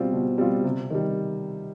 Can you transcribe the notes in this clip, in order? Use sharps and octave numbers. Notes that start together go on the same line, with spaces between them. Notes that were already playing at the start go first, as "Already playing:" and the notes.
Already playing: B2 G3 C4 F4
B2
G3 C4 F4
C3
D#3 G3